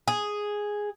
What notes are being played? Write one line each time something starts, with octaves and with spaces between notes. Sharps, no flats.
G#4